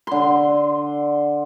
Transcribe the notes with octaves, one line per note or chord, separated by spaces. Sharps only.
D3 C6